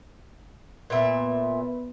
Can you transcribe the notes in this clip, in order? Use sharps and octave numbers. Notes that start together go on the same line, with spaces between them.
A#2 B3 B4 E5